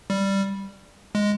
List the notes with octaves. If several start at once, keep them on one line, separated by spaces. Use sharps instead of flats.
G3
G#3